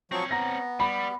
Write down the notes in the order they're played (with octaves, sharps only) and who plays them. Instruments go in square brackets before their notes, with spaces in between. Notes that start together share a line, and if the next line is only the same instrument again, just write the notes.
[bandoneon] F3 F#3 C#6 [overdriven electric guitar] C4 C#5
[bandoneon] B3 [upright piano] A#5 A#6
[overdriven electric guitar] G3 [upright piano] B5